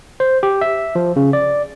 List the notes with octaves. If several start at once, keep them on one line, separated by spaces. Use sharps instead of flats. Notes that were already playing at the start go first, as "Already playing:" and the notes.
C5
G4
E5
F3
C#3
D5